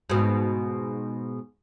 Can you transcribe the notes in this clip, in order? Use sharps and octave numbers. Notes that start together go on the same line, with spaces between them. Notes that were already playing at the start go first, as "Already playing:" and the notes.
G#2 B2